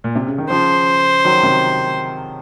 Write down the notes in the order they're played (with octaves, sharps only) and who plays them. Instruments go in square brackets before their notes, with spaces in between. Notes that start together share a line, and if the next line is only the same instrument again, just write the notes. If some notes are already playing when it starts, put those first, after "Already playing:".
[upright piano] A#2
C3
C#3
D#3
[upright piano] C#3 F3 [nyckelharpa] C5
[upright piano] D#3 F#3
C3 D#3